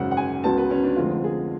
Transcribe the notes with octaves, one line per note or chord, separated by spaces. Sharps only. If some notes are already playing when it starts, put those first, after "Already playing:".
Already playing: G#1 F#2 C#3 F#5
F#5
G#5
C#2 C#3 F#3 B3 A5
B4
C#4
D4
F1 F2 D3 G#3 F4
G#4